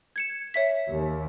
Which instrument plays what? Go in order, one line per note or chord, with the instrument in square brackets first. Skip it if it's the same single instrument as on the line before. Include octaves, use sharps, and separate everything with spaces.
[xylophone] G#6 C#7 E7
C#5 E5 B6
[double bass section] D#2